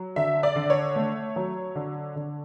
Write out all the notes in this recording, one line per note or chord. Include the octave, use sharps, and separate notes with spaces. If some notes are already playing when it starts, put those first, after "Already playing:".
Already playing: F#3
D3 E5
D5
D3
C#5
A3
F#3
D3
D3